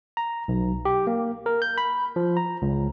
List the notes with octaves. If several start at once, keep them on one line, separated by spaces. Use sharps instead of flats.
A#5
B1
G4
A#3
A#4
G6
B5
F3
A#5
C#2